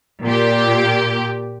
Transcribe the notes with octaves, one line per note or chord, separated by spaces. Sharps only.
A#2 G4